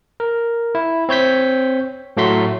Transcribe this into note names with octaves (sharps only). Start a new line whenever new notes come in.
A#4
E4
C4 C#5 G6 B6
A2 F#3 A3 F#4 C6 B6